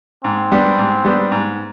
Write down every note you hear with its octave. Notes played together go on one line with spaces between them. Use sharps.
G#2 C4
G3 B3 D4 G4
G#2
G3 B3 D4 G4
G#2